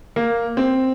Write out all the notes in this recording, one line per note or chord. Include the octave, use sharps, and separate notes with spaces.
A#3
C4